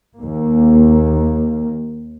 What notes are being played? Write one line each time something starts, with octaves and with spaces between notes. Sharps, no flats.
D#2 A#3